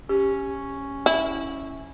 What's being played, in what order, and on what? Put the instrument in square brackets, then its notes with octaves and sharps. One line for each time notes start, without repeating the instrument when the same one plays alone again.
[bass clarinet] C#4 [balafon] G4
[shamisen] E4